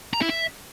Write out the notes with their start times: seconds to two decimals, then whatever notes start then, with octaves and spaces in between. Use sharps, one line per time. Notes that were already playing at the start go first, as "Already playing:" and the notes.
0.13 A#5
0.21 E4
0.29 E5